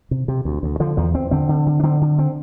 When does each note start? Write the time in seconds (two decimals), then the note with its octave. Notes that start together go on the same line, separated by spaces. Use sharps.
0.11 C3
0.28 C3
0.45 D2
0.63 D2
0.80 D3 F3
0.97 E2 F3
1.15 E2 C4
1.31 D3 C4
1.49 D3
1.66 D3
1.80 D4
1.83 D3 C4
2.01 D3
2.19 C4